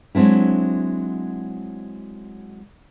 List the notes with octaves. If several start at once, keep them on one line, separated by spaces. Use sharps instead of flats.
F#3 G#3 C4 D4 E4